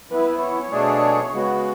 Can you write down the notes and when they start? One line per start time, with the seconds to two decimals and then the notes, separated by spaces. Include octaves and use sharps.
0.10 E3 B3 E4 B4
0.40 C#5
0.71 B2 A3 D4 G#4
1.32 C#3 G#3 B3 F#4